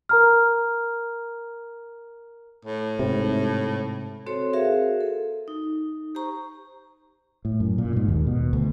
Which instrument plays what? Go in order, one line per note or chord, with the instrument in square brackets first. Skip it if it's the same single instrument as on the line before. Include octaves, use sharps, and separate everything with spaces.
[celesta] A#4 A#5 F6
[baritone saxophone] A2
[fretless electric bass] G#2 C3
[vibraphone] C4 F#4 A4 C5 C#5
F#4 G#4 A#4 C5 E5 F5
A4
D#4
G4 C5 A#5 C#6
[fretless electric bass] A2
F#2
A#2
G#2
D#2
B2
D2